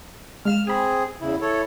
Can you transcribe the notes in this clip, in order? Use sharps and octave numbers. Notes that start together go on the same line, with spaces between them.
G#3 F5 F6 E7
C4 G#4 G#5 B5
E2 C#3 E4
E4 A4 C#5